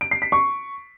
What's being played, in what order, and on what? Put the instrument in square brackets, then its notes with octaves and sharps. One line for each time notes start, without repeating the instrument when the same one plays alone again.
[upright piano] D7
C7
B6
C#6